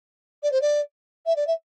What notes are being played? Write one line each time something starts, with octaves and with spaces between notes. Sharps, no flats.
D5
C5
D5
E5
D5
E5